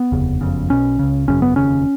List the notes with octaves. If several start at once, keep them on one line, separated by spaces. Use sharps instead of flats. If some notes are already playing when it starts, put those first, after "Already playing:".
Already playing: B3
F1 D#2 C#3
F#1 F2 C#3
B1 B2 C#4
C#2 C#3
G#1 F#2 C#3 C#4
B3
F1 D#2 C#3 C#4